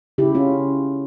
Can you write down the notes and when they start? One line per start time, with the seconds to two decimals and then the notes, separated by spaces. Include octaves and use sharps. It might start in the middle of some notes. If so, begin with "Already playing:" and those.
0.18 C#3 E4 G4
0.35 C#4 F4